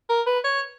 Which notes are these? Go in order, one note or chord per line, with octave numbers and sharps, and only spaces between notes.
A#4
B4
C#5